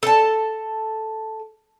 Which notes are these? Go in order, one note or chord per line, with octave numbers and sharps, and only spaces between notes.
A4 A5